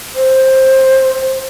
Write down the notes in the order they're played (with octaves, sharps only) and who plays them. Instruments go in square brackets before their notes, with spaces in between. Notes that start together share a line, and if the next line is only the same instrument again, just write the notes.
[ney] C5